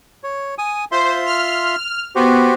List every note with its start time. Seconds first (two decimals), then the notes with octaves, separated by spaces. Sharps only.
0.24 C#5
0.58 G#5 D#6
0.92 F4 C5 E5 C6
1.26 F6
2.16 B3 F#4 G4 C5